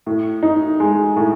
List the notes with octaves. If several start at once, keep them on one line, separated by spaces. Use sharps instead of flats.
A2
D#4
G#3
A2